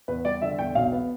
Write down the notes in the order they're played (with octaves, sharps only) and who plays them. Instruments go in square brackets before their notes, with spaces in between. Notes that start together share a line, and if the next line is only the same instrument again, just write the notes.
[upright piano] E2 B4
G3 D5
D3 E5
E2 G5
B1 F5
B3